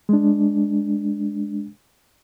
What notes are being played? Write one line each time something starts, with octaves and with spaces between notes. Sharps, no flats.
G#3 D4